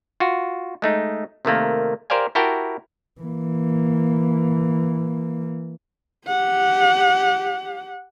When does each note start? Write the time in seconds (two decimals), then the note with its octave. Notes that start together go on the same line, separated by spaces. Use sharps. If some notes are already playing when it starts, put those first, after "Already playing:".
0.20 F4 F#4
0.82 G#3 A3 D#4
1.45 C3 D#3 A3 A#3
2.10 G4 A#4 C5 D5 F5 G#5
2.35 E4 F#4 G4 A#4 G5 A5
3.21 E3 A#3
6.28 G4 F#5